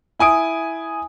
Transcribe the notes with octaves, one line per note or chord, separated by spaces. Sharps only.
E4 G#5 D#6 D7